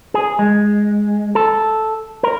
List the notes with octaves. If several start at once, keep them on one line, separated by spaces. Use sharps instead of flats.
G#4
G#3
A4
A#4